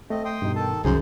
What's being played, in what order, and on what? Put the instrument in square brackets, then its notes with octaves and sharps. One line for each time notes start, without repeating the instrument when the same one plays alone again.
[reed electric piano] A3 [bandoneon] C4 D#5
[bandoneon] G5 C6 D#6
[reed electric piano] G2 B2 D#4
[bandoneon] D#3 A4 A5
[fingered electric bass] C2 D#3 [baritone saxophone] F#2 [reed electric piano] G#4 [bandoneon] C5